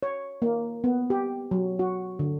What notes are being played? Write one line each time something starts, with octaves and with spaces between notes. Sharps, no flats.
C#5
A#3
B3
G4
F#3
F#4
D3